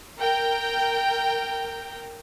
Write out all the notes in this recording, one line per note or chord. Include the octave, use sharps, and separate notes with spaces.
A#4 G5